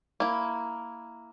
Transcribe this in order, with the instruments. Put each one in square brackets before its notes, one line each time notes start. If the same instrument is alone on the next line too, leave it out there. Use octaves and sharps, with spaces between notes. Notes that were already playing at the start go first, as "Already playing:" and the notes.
[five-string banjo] A#3 E4